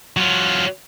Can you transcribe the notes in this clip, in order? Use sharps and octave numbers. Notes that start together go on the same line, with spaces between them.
F#3 F4